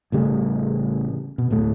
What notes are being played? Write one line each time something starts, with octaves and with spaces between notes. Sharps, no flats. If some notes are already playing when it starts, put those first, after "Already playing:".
A1 C#3 G3 A3
B2
D1 A2 A3